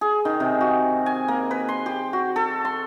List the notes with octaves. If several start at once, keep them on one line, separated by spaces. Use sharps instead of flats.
G#4
D#3
C3
F#4
G#5
A#3
B4
C6
G4
F#4
A4
C6